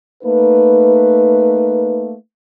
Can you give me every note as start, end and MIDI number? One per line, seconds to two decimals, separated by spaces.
0.23 2.14 57
0.23 2.14 58
0.23 2.14 63
0.23 2.14 71